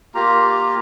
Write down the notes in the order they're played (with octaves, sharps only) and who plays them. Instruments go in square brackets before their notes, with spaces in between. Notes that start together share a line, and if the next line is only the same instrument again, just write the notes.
[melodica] A#3 F4 G4 A#5